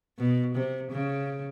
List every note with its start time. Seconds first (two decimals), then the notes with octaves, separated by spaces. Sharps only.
0.19 B2
0.55 C3
0.92 C#3